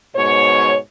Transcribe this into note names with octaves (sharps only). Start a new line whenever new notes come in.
G#2 B2 C#5